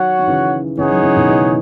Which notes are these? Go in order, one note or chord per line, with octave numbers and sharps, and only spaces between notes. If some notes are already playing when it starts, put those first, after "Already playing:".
Already playing: D#3 F#3 F#4 C#5 F#5
D#3
C#3 E3
C#3 E3 D#4 G#4 C#5 F#5
D#3 F#3
C#3 E3
B2 D#3
C#3 E3